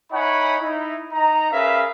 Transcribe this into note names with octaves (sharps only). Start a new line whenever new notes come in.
D#4 E4 C#5 F#5 G#5 B5
D#4 E4
D#4 A#5
C#4 G#4 A#4 B4 E5 F5